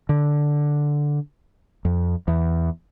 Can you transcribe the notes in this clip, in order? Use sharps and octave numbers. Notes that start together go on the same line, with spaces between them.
D3
F2
E2